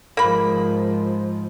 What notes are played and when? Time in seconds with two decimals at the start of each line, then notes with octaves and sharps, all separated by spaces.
0.17 G#2 F3 A#3 B5